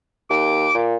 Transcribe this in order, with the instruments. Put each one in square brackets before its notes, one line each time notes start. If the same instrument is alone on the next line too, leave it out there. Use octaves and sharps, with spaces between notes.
[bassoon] D#2 [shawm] D6
[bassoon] A#2